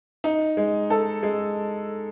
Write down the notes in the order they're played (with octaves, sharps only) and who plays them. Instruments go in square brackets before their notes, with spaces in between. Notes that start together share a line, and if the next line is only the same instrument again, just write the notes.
[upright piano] D#4
G#3
A4
G#3